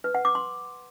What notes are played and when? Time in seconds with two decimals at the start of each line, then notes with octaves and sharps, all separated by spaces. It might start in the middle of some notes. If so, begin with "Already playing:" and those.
0.04 B4
0.15 F#5
0.25 D6
0.35 C6